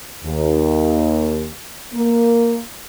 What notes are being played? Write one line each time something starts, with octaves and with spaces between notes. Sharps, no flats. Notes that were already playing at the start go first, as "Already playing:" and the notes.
D#2
A#3